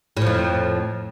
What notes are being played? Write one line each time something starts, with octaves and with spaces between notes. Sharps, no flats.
F2 A2 F3